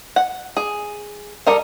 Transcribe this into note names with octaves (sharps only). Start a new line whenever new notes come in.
F#5
G#4
G3 A4 A#4 D#5 F5